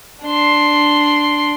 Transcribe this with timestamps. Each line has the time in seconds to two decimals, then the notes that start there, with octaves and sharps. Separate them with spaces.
0.24 D4 C6